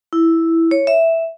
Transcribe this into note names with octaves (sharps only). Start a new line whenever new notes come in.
E4
C#5
E5